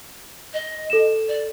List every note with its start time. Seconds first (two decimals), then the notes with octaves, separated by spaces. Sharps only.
0.54 D#5
0.90 A4 E7
1.28 D5